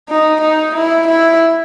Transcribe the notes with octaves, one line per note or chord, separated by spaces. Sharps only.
D#4
D#4
E4
E4